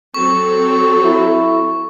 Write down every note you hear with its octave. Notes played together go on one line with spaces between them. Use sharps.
F#3 C4 A4 C#6
E4